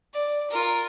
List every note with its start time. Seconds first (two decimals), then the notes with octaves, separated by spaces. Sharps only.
0.13 D5
0.51 F4 A#4